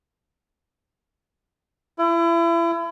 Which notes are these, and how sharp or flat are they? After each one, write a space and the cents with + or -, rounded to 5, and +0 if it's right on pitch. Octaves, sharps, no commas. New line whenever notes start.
E4 +35